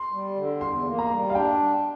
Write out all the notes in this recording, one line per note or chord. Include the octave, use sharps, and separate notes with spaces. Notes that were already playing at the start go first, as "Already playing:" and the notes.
Already playing: C6
G3
D3
E2 C6
A#3
A#5
G3
F5
D4 G5